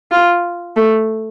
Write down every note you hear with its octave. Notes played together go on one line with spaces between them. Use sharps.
F4
A3